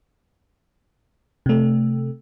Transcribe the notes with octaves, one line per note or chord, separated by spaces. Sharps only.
C3 A3